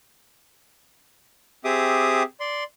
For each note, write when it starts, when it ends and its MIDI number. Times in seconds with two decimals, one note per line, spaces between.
1.65 2.23 60
1.65 2.23 67
1.65 2.23 68
1.65 2.23 76
1.65 2.23 86
1.65 2.23 87
2.40 2.64 74
2.40 2.64 84